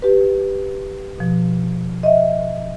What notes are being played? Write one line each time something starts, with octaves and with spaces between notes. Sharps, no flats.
G4 B4
B2 F3
D#5 E5